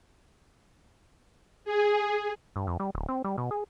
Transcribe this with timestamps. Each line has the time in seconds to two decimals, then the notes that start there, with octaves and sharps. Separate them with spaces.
1.65 G#4
2.56 G2
2.67 F2
2.80 G3
2.95 D1
3.09 C4
3.24 G3
3.38 B2
3.51 G#4